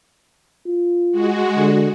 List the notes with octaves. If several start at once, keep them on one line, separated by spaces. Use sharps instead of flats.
F4
G#3 F#4
D3